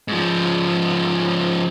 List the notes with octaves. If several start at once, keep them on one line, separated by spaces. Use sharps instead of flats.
G#2 F3